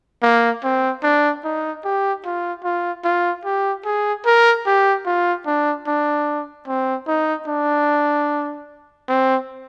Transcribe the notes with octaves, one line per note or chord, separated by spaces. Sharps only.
A#3
C4
D4
D#4
G4
F4
F4
F4
G4
G#4
A#4
G4
F4
D4
D4
C4
D#4
D4
C4